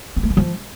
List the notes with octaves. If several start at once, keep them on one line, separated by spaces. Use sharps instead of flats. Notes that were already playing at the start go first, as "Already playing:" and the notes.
C4
A3
E3
F3